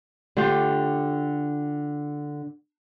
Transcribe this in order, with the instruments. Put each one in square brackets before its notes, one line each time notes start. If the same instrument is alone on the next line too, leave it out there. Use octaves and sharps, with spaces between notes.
[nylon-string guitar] D3 A3 F4 G4